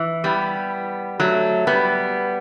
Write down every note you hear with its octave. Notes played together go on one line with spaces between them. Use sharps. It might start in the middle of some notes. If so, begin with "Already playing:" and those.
Already playing: E3
G3 B3
F#3 A3
G3 B3